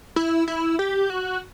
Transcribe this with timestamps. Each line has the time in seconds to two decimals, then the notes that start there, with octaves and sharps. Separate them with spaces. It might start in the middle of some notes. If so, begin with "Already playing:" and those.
0.16 E4
0.48 E4
0.79 G4
1.10 F#4